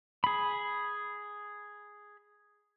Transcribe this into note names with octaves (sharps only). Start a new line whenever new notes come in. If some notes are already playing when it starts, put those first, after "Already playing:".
G#4 B5